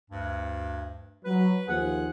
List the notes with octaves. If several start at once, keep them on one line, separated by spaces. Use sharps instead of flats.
D2 G2
F#3 B4
D#2 F3 G#4 F#5